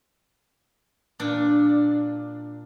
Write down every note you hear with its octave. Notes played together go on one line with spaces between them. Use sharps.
A#2 D4